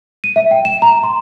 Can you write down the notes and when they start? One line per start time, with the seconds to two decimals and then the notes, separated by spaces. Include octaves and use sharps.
0.24 D#7
0.36 E5
0.51 G5
0.65 E7
0.82 A#5
1.03 C6